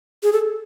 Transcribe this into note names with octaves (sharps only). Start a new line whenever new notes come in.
G#4
A4